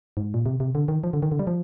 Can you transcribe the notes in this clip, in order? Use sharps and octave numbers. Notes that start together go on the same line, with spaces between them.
G#2
A#2
C3
C3
D3
D#3
F3
D3
D#3
D3
G3
F3